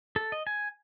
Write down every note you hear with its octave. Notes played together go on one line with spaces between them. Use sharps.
A4
D#5
G#5